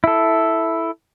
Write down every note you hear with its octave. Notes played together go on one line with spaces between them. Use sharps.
E4 A4